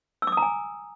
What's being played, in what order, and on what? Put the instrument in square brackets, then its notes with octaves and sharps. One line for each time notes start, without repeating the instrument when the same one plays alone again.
[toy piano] E6
D6
D#6
A#5
G#5